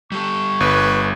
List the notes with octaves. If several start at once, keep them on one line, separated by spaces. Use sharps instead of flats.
G3 G4 A4 C#6
G1 B4